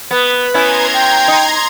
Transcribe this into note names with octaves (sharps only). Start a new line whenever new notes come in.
B3 B4
B3 C#4 E4 A#5 C6 G#6
G5
D#4